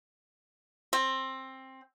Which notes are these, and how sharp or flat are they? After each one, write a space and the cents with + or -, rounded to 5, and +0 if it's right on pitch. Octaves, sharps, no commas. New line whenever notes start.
C4 +15